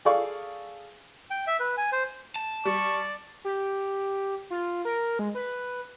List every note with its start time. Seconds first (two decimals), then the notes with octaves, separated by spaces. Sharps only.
0.05 G#4 A4 D5 F5 C#6
1.30 G5
1.47 E5
1.60 B4
1.77 G#5
1.92 C5
2.36 A5
2.65 G3 D5 C#6
3.45 G4
4.50 F4
4.85 A#4
5.19 G#3
5.35 B4